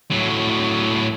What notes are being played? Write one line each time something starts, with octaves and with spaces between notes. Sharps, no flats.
A2 F#3